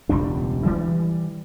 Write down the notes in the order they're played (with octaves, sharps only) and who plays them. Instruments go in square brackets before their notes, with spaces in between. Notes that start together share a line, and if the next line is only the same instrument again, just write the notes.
[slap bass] E1 C#2 G3 D4
E3 G3